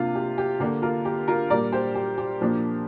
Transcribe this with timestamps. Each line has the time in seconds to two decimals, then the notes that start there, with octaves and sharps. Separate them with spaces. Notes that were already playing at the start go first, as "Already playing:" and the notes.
Already playing: C3 A#3 D4 F4
0.15 G4
0.38 G4
0.60 D3 A#3 D4 G4
0.82 F4 A#4
1.05 G4
1.28 F4 A#4
1.50 A#2 G3 A#3 A#4 D5
1.72 G4 C5
1.95 G4
2.18 G4
2.41 A#2 F3 A#3 D4